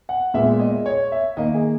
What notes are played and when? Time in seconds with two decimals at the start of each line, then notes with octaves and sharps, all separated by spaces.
0.09 F#5
0.34 A#2 G#3 B3 E5
0.59 D#5
0.86 C#5
1.12 E5
1.37 D#3 A#3 D#5
1.54 G#4